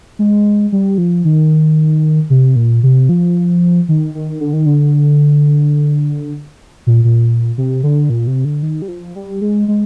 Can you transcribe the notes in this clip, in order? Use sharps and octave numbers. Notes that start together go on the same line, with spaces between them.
G#3
G3
F3
D#3
C3
A#2
C3
F3
D#3
D#3
D3
D#3
D3
A#2
A#2
C3
D3
A#2
C3
D3
D#3
G3
F3
G3
G#3
G#3